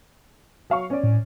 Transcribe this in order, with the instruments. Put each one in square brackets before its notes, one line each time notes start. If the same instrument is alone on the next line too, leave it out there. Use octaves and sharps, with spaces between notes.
[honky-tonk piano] F#3 F5 C#6
C#4 D5
[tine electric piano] A2